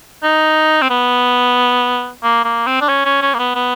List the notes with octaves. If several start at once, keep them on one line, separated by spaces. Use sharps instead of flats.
D#4
C4
B3
A#3
A#3
C4
D4
C#4
C#4
C#4
A#3
B3
B3